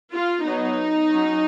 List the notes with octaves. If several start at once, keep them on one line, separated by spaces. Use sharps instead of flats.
F4
F#3 B3 D#4
F#3 C#4